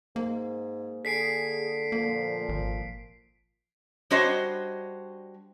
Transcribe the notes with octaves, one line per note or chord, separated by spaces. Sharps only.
G#2 A#3
D3 G#4 B6 C7 D7
A#2 F3 A#3
G#1
G3 D4 F#4 C5 C#5 D#5